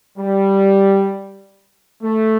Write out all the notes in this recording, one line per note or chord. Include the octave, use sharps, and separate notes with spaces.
G3
A3